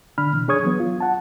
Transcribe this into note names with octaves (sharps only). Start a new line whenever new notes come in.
D3 D4 B5 F6
B2 E3
D4 G#4 C#5 C#6 D#6 G#6
E3 F#3 B3
F4
F#5 A5